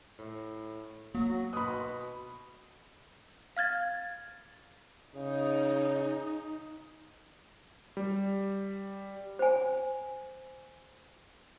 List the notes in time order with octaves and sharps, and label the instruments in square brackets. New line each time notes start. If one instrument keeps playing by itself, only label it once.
[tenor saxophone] A2
[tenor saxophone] F#3 [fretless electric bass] A#3
[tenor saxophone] B2 [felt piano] B5 D#6
[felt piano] B5
[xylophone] F5 F6 G#6 A6
[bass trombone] C#3 [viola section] D#4
[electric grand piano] G3
[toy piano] C5 G#5